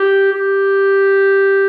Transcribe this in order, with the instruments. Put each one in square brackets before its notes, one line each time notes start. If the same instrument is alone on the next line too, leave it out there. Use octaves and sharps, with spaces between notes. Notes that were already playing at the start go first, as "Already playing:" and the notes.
Already playing: [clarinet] G4
G4